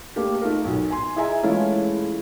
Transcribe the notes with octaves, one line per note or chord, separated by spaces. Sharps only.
A3 A#3 D4 G4
A3 D#4 F4 A#4
B1
G#5 C6
E4 G#4 D#5 E5 G#5 A#5
E3 G#3 A3 C#4 E4 F4